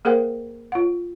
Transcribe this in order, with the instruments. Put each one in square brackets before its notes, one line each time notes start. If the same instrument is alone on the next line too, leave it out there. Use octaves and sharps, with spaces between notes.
[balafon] A#3 G#4 A#4 C5 F#5 G5
F4 F#5